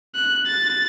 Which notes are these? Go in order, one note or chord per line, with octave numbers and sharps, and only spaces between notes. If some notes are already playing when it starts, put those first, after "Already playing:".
F#6
A6